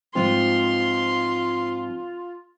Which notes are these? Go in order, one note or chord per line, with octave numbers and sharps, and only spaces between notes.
G#2 F3 C4 F4 C6